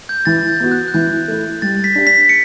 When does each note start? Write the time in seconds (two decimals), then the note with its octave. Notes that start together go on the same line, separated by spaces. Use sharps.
0.09 G6
0.25 E3 A6
0.49 G6
0.60 B3 F#4
0.71 F#6
0.88 F#6
0.94 E3 G6
1.28 A3 E4
1.62 G3 A6
1.84 B6
1.95 D4 G4
2.07 B6
2.29 C#7